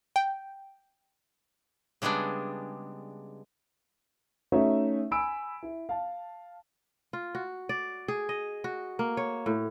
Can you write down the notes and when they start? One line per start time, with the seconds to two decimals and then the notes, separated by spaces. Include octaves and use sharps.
0.16 G5
2.02 C#3 G3 G#3 B3 D4
4.52 A3 C#4 D#4 F#4 C#5 E5
5.11 G#5 B5 E6 D7
5.63 E4
5.89 F5 A5
7.13 F4
7.35 F#4
7.69 D5
8.08 G#4
8.29 D#5
8.64 F#4
8.99 A#3
9.17 C#5
9.46 A2